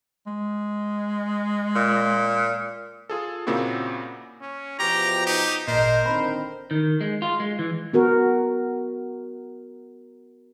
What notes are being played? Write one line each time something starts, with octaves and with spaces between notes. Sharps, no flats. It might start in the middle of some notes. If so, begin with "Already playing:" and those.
G#3
A#2
F4 G#4 A4
A#2 C#3 A#3 C4 E4 F#4
C#4
E2 B2 F3 G4 A#5
D#4 G4
G#1 A#2 A#4 C5 D#5
D3 D#3 C4 B5
D#3
G#3
F4
G#3
E3
B3 F#4 A#4